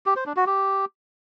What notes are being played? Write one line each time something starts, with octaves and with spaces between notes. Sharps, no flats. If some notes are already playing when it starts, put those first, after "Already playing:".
G4
C5
D4
F#4
G4